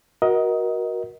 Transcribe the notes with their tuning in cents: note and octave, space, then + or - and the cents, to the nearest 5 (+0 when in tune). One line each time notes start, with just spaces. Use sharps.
F#4 +0 A#4 +25 D#5 +20